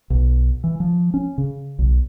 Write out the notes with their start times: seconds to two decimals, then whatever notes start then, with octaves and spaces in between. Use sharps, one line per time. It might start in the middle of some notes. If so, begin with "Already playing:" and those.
0.10 B1
0.64 E3
0.80 F3
1.14 C#4
1.38 C#3
1.79 B1